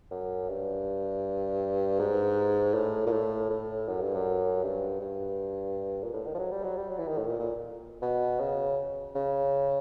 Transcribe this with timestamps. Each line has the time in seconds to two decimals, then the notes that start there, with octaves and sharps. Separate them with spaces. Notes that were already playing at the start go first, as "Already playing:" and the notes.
0.11 F#2
0.49 G2
2.00 G#2
2.74 A2
3.06 A#2
3.12 A2
3.50 A2
3.88 F#2
4.01 G2
4.15 F#2
4.63 G2
5.01 G2
6.03 A#2
6.14 A2
6.26 D#3
6.35 F3
6.39 F#3
6.51 G3
6.64 F#3
6.77 G3
6.89 F#3
6.99 E3
7.08 D#3
7.17 A2
7.27 A#2
7.39 A#2
8.02 B2
8.40 C#3
9.15 C#3